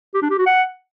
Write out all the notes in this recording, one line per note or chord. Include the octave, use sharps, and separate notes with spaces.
G4
D4
G4
F#4
F#5